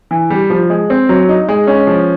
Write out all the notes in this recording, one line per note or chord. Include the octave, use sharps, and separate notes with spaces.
E3
G3
F3
G#3
C4
F#3
D#4
G#3
C#4
F3